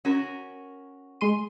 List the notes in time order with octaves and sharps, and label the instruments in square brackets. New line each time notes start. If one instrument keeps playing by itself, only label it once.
[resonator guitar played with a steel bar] C#4 F#4 A#4
[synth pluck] G#3 C6 D#7